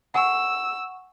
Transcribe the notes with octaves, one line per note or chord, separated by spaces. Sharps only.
F#5 G#5 C#6 E6